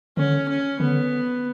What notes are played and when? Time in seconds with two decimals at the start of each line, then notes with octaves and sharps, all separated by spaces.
0.17 D3 C#4
0.48 C#4
0.80 D3 B3